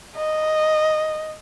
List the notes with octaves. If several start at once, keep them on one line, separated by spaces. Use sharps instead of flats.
D#5